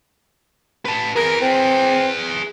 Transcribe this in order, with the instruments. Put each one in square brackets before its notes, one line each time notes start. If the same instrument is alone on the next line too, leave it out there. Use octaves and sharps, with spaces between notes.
[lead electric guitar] B4 A5
[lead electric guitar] G#4 B4 [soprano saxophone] A#4
[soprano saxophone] C4